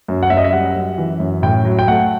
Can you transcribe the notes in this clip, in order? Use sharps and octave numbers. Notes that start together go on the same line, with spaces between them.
F#2
F#5
F#2 E5
D#5
E5
G3 F#5
F#2
E3
F#2
A2 G5
F#3
G5
A3 F#5